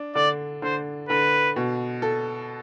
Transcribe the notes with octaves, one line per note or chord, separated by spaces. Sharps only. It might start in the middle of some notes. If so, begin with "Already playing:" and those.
Already playing: D4
D3 D5
D3 C5
D3 B4
B2
A4